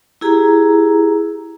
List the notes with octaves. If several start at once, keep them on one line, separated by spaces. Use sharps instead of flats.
E4 G4 G#4 A#5